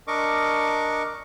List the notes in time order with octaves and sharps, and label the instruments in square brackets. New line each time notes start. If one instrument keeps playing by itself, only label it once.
[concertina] D4 A#4 D#5 C#6 D6